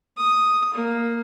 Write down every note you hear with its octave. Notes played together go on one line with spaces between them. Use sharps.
D#6
A#3